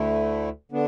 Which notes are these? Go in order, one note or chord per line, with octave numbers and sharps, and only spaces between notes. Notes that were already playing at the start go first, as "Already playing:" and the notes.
Already playing: D2 D3 A3 E4
D3 B3 D4